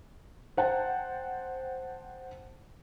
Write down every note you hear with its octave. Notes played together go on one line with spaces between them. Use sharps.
C5 F#5 G5 A5